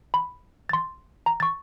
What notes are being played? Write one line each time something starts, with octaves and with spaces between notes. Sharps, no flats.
B5
C6 A6
A#5
C#6 A6